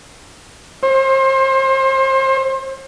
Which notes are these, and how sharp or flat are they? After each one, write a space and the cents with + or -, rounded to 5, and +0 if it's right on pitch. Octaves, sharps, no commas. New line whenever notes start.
C5 +35